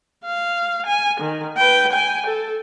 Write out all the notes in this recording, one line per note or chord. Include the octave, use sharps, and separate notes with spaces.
F5
G#5
D#3
B4 G5
G5 G#5
A4